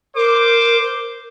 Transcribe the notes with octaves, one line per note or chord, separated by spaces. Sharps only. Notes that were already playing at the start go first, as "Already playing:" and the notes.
A#4 C5 D6